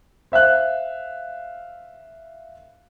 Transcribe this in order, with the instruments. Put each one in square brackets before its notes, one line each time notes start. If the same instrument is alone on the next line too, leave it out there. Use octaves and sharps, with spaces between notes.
[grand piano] C5 E5 F5 F#6